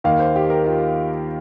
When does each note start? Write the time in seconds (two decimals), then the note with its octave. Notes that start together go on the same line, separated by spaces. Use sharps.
0.04 D#2 D#3 A#3 F5
0.19 C5
0.36 G4
0.50 A#4
0.66 F4